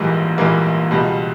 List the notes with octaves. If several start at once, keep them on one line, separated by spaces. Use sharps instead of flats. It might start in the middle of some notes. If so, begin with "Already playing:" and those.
Already playing: A#1 G#2 E3 G3 A#3
A#1 G#2 E3 G3 A#3
C#2 B2 G3